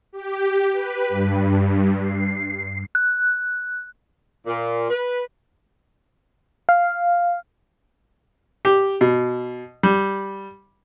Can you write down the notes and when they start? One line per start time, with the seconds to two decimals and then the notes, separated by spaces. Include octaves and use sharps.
0.12 G4
0.72 B4
1.09 G2
2.02 C7
2.95 F#6
4.45 A#2
4.88 B4
6.69 F5
8.65 G4
9.01 B2
9.83 G3